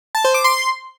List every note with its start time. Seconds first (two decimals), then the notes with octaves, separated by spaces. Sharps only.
0.15 A5
0.24 C5
0.34 D6
0.44 C6